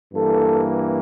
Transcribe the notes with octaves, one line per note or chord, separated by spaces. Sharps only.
G2 E3 A#3 A4